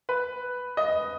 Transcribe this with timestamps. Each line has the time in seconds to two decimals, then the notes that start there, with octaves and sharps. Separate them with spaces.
0.09 B4
0.77 D#5